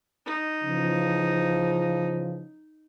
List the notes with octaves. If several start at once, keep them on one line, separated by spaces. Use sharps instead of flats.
D#4
C#3 E3 F3